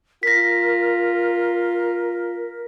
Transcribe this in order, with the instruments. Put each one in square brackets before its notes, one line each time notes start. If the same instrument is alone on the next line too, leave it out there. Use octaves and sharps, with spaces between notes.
[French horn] F4 [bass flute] A#4 [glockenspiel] A#6 B6